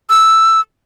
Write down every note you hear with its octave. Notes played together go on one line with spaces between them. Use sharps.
E6